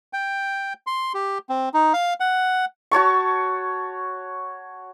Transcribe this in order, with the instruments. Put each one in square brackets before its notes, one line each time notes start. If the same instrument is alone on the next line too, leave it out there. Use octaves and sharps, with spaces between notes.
[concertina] G5
C6
G4
C4
D#4
F5
F#5
[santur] F#4 C#5 A5 C#6